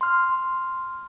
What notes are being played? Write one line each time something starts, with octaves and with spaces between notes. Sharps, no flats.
C6 F6